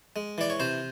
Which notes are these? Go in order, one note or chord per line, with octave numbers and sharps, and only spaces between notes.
G#3
E3 D5
C#5
C3 C5